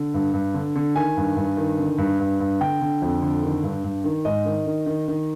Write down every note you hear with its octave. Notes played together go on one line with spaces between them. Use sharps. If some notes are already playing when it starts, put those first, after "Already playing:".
Already playing: D3
G2
G2
D3
D3
D#3 G#5
G2
G2
D#3
D3
G2
G2
G2
D3 G5
D3
F2
D3
D#3
G2
G2
D#3
G#2 D#5
D#3
D#3
D#3
D#3